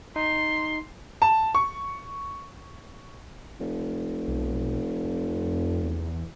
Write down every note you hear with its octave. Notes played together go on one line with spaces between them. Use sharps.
D#4 C6
A5
C#6
F1
B1
F2
E2